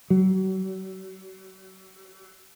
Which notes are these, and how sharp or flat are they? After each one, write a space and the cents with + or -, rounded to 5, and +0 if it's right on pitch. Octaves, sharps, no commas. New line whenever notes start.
F#3 +40